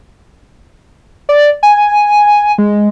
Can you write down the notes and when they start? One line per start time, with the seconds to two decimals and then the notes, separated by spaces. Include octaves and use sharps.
1.29 D5
1.63 G#5
2.58 G#3